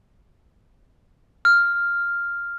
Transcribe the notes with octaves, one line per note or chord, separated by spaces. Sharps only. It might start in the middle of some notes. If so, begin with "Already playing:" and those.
F6